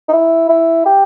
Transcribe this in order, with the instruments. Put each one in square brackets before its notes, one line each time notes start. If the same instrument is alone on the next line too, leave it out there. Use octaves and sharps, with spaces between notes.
[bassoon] D#4
E4
E4
G4